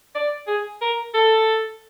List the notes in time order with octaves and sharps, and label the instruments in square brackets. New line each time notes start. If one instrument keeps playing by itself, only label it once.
[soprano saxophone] D5
G#4
A#4
A4